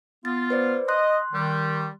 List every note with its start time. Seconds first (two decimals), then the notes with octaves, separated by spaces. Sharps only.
0.25 B3 F4 A6
0.50 B4 C5 D5
0.88 D#5 C6 F#6
1.33 D#3 G3